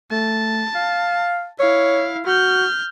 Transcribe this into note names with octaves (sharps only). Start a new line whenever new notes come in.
A3 A5
F5
E4 C#5 F5
F#4 F6 G6